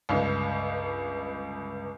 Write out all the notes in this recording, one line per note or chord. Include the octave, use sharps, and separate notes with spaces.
G1 C#2